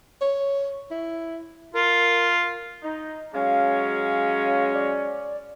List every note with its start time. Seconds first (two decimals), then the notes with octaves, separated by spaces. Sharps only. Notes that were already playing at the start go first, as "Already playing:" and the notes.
0.21 C#5
0.91 E4
1.74 F4 A#4
2.83 D#4
3.34 F#3 G#3 C#4 F5
4.74 D5